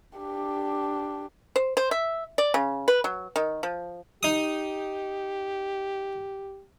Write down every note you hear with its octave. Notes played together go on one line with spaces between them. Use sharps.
D4 G4
C5
C5
E5
D5
C#3
B4
F#3
D#3
F3
D#4 G4 D#6